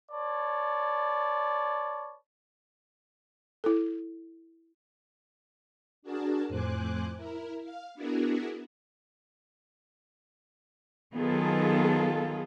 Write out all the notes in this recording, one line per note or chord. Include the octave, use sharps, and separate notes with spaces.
B4 C#5 D5 A5
E4 A4
D4 F#4 G#4 A#4 A5
F2 A2 C5 G#5 D6 F#6
E4 A#4
F5
B3 D4 E4 F#4 G#4 A#4
D#3 F#3 B3 F4 G#4 A4